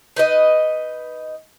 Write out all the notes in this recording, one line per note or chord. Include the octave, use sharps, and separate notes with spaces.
D#4 B4 D#5